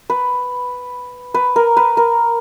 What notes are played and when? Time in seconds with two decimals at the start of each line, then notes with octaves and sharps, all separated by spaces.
0.10 B4
1.34 B4
1.56 A#4
1.77 B4
1.97 A#4